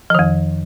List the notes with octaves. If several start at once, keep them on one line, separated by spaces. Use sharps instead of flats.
F2 D#3 F3